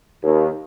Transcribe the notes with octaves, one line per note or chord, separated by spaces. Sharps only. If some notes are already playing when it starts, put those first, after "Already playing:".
D#2